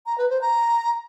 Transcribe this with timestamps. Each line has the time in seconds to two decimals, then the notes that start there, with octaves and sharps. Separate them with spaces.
0.06 A#5
0.18 B4
0.30 C5
0.41 A#5